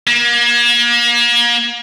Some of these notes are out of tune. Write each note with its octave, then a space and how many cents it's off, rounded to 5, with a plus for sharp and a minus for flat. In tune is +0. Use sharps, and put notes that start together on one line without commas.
A#3 +35